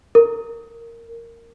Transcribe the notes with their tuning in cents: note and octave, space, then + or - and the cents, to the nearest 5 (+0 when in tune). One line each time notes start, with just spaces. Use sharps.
A#4 -10